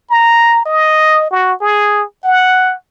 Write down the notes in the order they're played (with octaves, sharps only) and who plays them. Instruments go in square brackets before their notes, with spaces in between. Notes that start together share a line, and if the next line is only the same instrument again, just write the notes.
[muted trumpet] A#5
D#5
F#4
G#4
F#5